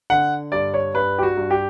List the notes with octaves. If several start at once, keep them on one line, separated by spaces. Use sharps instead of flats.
D3 F#5
G2 D5
C#5
G2 B4
G4
F#4
G2
G4